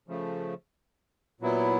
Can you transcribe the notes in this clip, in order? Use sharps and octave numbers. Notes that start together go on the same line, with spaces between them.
C#3 F3 A3
A#2 F#3 B3 E4